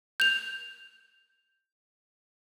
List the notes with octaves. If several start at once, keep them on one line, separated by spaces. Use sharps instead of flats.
G6 F7